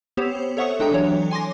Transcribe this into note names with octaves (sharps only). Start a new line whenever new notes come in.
B3 C4 G4 C5 C#5
A4 C#5 E5 F#5 C#6 D#6
G#3 D4 A4 G5 A#5 D#6
E3 F#3 D4 C#5
G#5 C6 D6 A#6